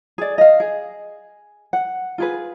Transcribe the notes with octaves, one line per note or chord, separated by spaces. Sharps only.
G#4 D5
D#5 F5
G#4
F#5
F4 G#4 B4